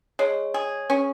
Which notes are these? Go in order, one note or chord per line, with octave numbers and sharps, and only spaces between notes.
G#3 C#5
G#4
C#4